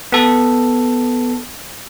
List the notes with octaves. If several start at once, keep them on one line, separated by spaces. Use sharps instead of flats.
B3 A4